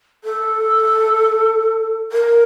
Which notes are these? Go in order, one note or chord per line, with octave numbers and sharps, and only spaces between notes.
A4
A#4